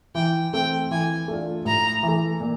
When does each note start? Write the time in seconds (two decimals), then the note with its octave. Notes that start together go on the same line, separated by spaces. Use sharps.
0.15 E3 G5
0.53 A3 C4 G5
0.91 E3 G#5
1.28 A3 D4 F4
1.65 A2 A#5
2.03 E3
2.08 A3
2.41 A#2